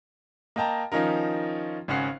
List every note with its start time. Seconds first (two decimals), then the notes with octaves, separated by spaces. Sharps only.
0.56 A#3 D#5 G5 A5 A#5
0.92 D#3 F3 C#4 D#4 F4 A#4
1.88 G#1 C#3 C#4 F#5 C7